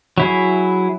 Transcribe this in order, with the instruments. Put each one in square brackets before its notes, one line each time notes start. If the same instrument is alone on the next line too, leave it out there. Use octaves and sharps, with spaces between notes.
[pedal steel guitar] F#3 E4 G#4